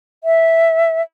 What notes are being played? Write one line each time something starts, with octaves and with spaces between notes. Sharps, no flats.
E5